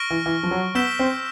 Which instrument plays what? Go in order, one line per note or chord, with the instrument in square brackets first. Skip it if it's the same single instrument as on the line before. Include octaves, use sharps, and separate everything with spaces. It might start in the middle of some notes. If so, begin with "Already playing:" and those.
Already playing: [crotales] C#6 F6 A#6 D7 G7
[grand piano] E3
E3
F3
F#3
[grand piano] B3 [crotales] E6 G6 B6 E7 G7
[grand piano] C4